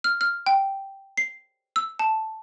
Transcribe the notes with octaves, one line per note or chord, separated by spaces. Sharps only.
F6
F6
G5
C7
E6
A5